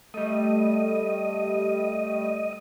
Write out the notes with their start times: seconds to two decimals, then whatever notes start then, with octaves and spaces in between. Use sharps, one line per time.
0.14 G3 A3 D#5